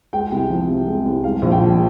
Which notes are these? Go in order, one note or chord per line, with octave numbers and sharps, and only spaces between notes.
G#3 G5
C2
F3
C3
G#3
C2
G#3 F5
A#1
G5
F3